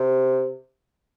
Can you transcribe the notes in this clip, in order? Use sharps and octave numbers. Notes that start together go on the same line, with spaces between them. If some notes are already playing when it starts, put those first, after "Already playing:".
Already playing: C3